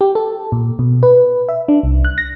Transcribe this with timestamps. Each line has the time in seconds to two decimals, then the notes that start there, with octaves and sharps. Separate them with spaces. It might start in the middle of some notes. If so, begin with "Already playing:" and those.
0.01 G4
0.15 A4
0.52 A#2
0.79 B2
1.03 B4
1.49 E5
1.68 D4
1.83 C2
2.05 F#6
2.18 A#6